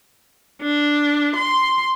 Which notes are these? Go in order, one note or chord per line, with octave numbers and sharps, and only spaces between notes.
D4
C6